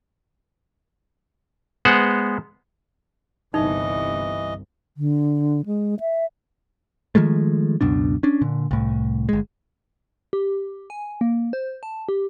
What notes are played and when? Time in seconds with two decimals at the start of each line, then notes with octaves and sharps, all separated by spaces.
1.85 G#3 B3 C5 F#5
3.54 G1 C2 E3 D#4 D#5
4.97 D3
5.66 G#3
6.00 E5
7.15 D#3 F3 G#3 A3
7.81 C#2 F#2 B2 D4
8.23 C#4 D4
8.41 A#2 D3
8.71 C2 A2
9.29 G1 G#3
10.33 G4
10.90 G#5
11.21 A#3
11.53 C5
11.83 A5
12.09 G4